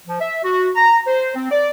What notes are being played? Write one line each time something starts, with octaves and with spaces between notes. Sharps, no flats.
F3
E5
F#4
A#5
C5
C4
D5